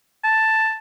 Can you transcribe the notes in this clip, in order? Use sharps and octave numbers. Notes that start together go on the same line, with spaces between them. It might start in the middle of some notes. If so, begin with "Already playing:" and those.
A5